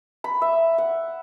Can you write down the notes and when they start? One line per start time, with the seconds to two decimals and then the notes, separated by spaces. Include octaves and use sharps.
0.24 B5
0.42 E5
0.78 F#5